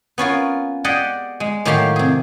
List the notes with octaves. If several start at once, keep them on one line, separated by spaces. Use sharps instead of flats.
B3 C#4 F4 A#4
G4 G#4 D5 D#5 F#5
G#3
A2 D#3 F#3 G4 F5 C6
C3 G#4